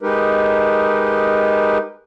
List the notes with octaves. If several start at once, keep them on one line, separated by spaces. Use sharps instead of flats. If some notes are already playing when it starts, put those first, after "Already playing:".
G#3 D#4 G4 A#4 B4